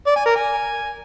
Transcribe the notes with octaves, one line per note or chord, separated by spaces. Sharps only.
D5
G#5
A#4
G#5